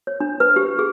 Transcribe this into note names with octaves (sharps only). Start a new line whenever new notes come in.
C#5
D4
B4
G4
G#4